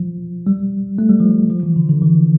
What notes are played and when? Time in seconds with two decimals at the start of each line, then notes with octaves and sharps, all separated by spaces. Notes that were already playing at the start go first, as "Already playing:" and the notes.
Already playing: F3
0.47 G3
0.99 A3
1.10 G3
1.20 F3
1.31 G3
1.50 F3
1.63 E3
1.76 D3
1.89 D3
2.02 E3